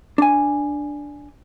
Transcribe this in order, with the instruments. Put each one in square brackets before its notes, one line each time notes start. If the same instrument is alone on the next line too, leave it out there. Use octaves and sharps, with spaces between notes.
[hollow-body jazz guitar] D4 G#5